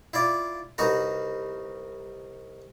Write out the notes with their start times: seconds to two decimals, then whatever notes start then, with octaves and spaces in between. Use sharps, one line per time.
0.13 E4 F4 D5
0.78 C2 D#4 F#4 B4 A#5